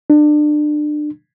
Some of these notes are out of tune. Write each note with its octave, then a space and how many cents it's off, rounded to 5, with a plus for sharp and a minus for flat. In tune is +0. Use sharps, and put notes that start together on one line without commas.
D4 +30